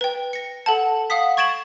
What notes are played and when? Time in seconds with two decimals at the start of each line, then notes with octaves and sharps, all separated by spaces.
0.01 B4 G5
0.33 A#6 C#7
0.66 A4 F#5 A5
1.10 F5 F#5 D#6 B6
1.37 C#6 G#6 A6 D7 E7 F#7